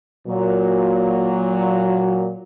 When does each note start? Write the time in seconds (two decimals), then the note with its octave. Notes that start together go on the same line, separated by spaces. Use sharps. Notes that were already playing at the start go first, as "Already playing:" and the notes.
0.27 A#2 F#3